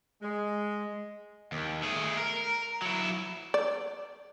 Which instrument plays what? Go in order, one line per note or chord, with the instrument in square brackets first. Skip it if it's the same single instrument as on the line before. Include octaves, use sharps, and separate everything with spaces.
[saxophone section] G#3
[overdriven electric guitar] D#2
A3 G#4
A#4
F#3 E4
[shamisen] D5